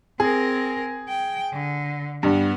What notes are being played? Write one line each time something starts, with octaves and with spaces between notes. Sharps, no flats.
C4 G#4 A#4
G5
D3
G2 B3